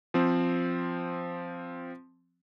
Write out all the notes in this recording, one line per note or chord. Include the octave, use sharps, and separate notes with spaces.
F3 C4